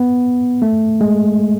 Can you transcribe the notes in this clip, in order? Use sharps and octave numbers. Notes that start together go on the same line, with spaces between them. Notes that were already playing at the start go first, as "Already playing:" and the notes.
Already playing: B3
A3
G#3